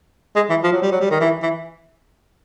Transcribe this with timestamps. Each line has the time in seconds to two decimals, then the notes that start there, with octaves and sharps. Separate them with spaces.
0.35 G#3
0.49 E3
0.63 F3
0.73 F#3
0.82 G3
0.92 F#3
1.01 G3
1.11 D#3
1.20 E3
1.42 E3